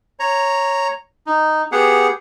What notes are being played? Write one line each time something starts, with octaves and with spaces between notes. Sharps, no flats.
C#5 A#5
D#4
B3 G4 G#4 F#5